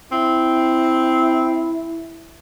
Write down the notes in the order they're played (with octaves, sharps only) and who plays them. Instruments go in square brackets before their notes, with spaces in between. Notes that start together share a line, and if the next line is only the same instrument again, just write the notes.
[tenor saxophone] C4 [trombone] E4